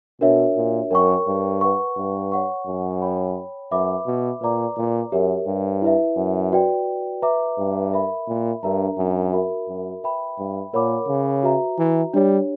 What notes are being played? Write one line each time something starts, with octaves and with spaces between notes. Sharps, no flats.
B2 D4 F#4 A#4 C#5 E5
A#2
F#2 A#4 C#5 G5 C#6
G2
B4 F#5 C#6
G2
C#5 F#5 C#6
F#2
C#5 G5 B5
F#2 B4 E5 B5 D6
B2
A#2 B4 D5 A#5 D6
A#2
F#2 G4 A#4 C#5 E5
G2
E4 B4 E5
F#2
F#4 B4 D5 G5
B4 E5 A#5 D6
G2
A#4 E5 B5
A#2
G2 D4 A#4 E5 A#5
F#2
F#4 A#4 E5 B5
F#2
B4 E5 G5 B5
G2
A#2 A#4 C#5 F#5 B5 D6
C#3
F#4 B4 E5 A#5
E3
G3 D4 G4 C#5